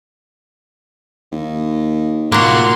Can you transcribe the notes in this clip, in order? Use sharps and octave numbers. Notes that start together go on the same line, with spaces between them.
D#2
A2 A#3 F4 F#4 C6